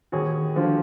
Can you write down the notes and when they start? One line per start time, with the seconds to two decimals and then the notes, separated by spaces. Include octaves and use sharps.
0.12 D#2 F#4 G#4
0.56 D3 F3